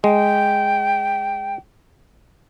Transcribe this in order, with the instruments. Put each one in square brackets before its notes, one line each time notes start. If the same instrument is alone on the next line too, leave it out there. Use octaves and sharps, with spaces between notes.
[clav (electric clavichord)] G#3 [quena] G5